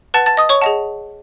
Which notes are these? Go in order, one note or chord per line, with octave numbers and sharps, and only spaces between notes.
B4 F#5 A5 A6
A5 A6
D#5 D#6
C#5 C#6
G#4 D#5 F#5 A5